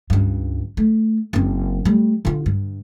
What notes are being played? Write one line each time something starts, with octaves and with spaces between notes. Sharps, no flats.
C#2 G2
A3
F#1 C4
G3 A3
D3 F4
G2